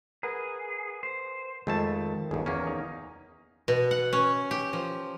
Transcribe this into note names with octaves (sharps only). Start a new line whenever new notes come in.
G#4 A#4 B4 F#5
C5
F2 D#3 G#3 A3 A5
G1 D#2 G#4
E2 A#3 C#4
D#4
B2
F#5
C#4
G4
F3